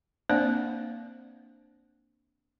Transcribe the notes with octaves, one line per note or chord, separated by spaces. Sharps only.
A#3 C4 D4 C5 D5 F#5